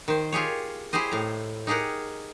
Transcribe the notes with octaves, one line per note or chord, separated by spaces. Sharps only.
D#3 C5
F4 G4 G#4 C#5
E4 G4 G#4 C5 D#5
A2 A#5
D#4 G4 G#4 A#4 F#5